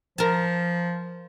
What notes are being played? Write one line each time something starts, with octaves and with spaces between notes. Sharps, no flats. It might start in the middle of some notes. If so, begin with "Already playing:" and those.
F3 A#4 A5